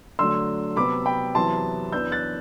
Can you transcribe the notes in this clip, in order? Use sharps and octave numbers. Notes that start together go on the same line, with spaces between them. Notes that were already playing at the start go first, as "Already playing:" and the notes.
D3 F#3 A3 C6 E6
C3 F#3 B3 B5 D6
G5 B5
E2 C3 F#3 B3 E4 A5 C6
F#2 E3 B3 D4 E6 G6
F#6 A6